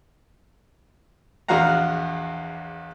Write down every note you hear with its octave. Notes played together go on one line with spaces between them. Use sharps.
A#1 E2 F#4 F5 F#5 A#5